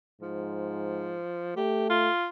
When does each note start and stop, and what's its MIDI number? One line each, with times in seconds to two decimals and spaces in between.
0.22 1.19 44
0.22 1.55 53
1.56 2.08 57
1.56 1.87 67
1.90 2.27 65